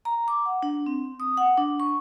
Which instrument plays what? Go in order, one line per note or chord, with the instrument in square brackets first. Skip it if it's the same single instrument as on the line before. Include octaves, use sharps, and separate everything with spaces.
[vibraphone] A#5
D6
F#5
D4
C4
D#6
F#5
D4
C#6